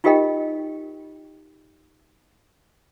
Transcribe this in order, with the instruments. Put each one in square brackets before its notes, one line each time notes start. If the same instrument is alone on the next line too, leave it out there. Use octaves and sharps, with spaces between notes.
[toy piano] D#4 F4 G4 A#4 D#5 G5